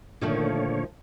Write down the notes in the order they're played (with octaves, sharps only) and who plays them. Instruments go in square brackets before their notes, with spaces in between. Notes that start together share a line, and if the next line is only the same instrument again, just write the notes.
[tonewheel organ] A#2 D3 C#5 [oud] D#3 F3 A3